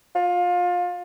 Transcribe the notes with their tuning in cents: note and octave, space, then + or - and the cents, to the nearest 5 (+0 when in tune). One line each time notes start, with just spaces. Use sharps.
F4 +25